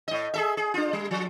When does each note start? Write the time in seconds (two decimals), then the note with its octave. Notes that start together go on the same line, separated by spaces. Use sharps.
0.08 A2 D#5
0.34 G#4 A4 E5
0.57 G#4
0.74 D4 F4
0.93 G3
1.11 F3